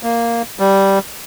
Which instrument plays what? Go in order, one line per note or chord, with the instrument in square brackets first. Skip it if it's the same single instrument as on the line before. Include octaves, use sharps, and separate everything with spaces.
[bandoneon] A#3
G3